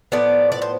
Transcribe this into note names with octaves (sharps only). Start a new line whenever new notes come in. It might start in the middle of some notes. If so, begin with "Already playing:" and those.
A2 F3 B3 D5
D5
C5